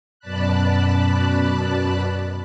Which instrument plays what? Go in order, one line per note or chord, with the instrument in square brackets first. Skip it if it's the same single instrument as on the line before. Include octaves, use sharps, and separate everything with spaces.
[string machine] F#2 B2 D5 A5 B5 F#6